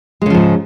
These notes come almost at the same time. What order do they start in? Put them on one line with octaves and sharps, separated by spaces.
G#3 C#3 F3 G#2